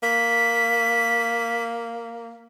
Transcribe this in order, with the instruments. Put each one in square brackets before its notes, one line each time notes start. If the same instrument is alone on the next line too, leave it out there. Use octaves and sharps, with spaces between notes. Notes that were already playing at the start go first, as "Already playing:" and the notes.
[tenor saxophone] A#3 [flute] B6